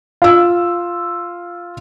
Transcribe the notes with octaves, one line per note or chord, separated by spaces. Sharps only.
F4 E6